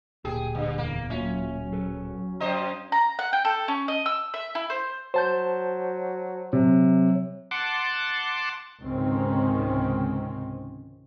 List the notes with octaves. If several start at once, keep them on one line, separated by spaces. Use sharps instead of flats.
D1 A#2 G4 G#4 G5
G2 D3
E2 A#3
F#3 A#3 C#4 F4 E5
G#4 A4 B4
F#2 C5 D#5 G5 A#5
A#5
F#5
G5
A4
C#4
D#5
E6
E5
E4
C5
F#3 C5 A5 G6
C3 F#3
F#5 A5 C6 D6
C#2 G#2 C3 D#3 C4 C#4